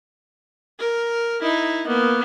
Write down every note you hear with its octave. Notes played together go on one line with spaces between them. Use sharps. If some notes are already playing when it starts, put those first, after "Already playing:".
A#4
D#4 E4
A#3 B3